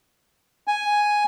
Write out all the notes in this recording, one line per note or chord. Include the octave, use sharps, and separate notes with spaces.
G#5